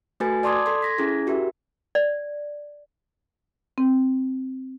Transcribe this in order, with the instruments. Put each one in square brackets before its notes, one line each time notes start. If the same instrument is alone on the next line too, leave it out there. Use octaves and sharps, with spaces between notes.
[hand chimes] A3 F#4 A4 B4 G#5 A6
D5 A5 C6 D6 D#6 G#6
A4 C6
G#6 A#6 B6
C#4 E4 G#4
F#4 G4 A#4 E5
[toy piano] D5
[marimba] C4